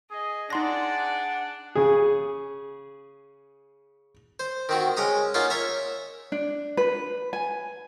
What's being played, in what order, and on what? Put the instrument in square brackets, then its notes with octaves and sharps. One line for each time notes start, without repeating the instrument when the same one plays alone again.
[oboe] G#4 [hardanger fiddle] D#5
[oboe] D4 [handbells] D#4 C6 A#6 [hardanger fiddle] G#4 D5 [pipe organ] F#5
[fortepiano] C#3 G#4
[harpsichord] C5
D#3 C4 F#4
C#3 G#3 A#5 D#6
A#3 C#4 D#4 F4 F5 F#5
C#5 E5 A#5
[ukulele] D4
B4
G#5